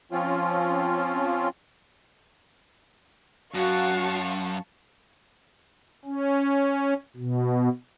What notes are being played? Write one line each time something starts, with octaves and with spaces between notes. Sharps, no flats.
F3 C4 C#4 F4
F#2 F#4 F5 A5 C#6
C#4
B2